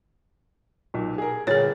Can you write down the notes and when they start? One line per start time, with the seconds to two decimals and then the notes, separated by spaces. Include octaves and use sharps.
0.94 B1 A#2
1.18 G#4 A#4
1.47 G1 A#2 G#4 C#5 A6